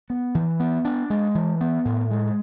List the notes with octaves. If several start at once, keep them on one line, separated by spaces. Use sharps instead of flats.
B3
E3
B3
D4
G#3
E3
B3
A2
G#3